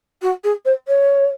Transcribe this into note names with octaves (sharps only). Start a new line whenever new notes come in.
F#4
G#4
C5
C#5